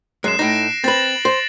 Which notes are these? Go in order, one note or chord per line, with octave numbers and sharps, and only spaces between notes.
F#2 G#3 F#6 C7 E7
A2 D#4 A#6 D7
C4 B4 A6 A#6 F#7
C5